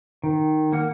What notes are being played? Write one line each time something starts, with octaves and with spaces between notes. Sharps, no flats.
D#3
A#3 F#5 F6